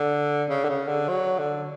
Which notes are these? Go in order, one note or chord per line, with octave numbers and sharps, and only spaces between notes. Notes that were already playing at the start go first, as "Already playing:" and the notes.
Already playing: D3
C#3
D3
C#3
D3
F#3
D3